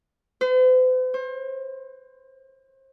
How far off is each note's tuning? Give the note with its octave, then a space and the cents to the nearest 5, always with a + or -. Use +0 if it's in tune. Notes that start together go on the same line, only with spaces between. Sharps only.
C5 -45
C5 +35